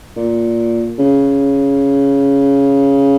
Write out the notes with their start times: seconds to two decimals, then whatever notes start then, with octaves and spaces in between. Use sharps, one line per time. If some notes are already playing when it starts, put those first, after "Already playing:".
0.17 A#2
0.99 C#3